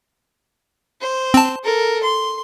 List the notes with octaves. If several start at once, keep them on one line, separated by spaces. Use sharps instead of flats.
C5
C4 A5
A4 A#4
C6